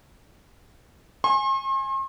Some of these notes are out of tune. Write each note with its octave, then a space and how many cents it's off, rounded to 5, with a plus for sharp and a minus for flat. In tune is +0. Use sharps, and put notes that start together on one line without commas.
G#5 +0 C6 +45